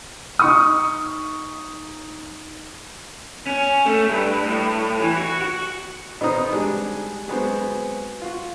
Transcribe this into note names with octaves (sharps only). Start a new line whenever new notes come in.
D#4 C#6 D#6
C#4
A3
G2
A2
E3
F#4
F#4
B2 B3 C4 D#4 A#5 D#6
G3 G#3 D4 G#5
F#3 G#3 B3 C4
F4 F#4